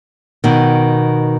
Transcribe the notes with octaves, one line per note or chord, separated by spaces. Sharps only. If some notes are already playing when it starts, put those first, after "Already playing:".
B2 D#3